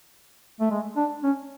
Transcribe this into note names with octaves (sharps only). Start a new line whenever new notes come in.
A3
G#3
D4
C#4